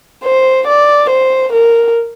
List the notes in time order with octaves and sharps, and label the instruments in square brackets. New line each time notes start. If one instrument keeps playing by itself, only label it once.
[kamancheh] C5
D5
C5
A#4